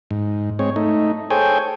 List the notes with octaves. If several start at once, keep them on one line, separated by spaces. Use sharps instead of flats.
G#2
G#3 C4 C#5
A3 D#4
G#4 A4 C5 C#5 G5 G#5